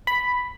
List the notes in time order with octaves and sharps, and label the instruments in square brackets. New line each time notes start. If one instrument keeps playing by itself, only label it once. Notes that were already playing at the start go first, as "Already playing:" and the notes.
[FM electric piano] B5